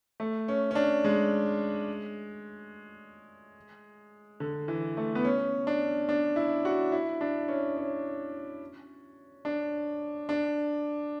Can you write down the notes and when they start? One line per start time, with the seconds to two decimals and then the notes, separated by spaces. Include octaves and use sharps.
0.20 A3
0.48 C#4
0.71 C#4
0.75 D4
1.04 G#3
4.40 D3
4.68 E3
4.97 A3
5.15 B3
5.25 C#4
5.67 D4
6.09 D4
6.36 E4
6.65 F#4
6.92 E4
7.21 D4
7.48 C#4
7.77 C#4
9.45 D4
10.29 D4